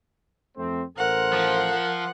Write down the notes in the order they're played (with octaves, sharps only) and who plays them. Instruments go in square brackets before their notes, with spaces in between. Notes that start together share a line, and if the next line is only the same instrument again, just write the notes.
[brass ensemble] F2 A3 C4
[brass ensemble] A1 A4 C5 [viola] A#4 [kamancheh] F#5
[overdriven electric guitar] F3